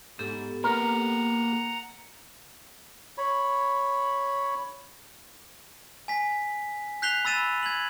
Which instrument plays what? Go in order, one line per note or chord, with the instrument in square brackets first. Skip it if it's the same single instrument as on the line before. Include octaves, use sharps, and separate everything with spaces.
[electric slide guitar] G#2 [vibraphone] B3 G4 A4
[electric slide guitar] A#3 B4 [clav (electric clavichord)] A#4 [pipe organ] F#5 A#5
[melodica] C#5 B5
[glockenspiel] G#5 B6
F#6 G6 B6 C7 F7 G7
B5 E6 A6 D#7 E7
G#6 F#7